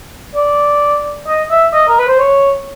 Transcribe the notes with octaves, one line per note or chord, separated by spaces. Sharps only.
D5
D#5
E5
D#5
A#4
B4
C5
C#5